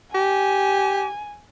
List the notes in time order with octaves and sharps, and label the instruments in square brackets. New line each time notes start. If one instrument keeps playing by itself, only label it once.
[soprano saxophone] G4 [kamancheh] G#5